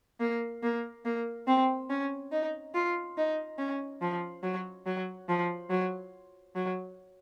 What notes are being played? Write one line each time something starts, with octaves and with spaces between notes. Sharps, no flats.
A#3
A#3
A#3
C4
C#4
D#4
F4
D#4
C#4
F3
F#3
F#3
F3
F#3
F#3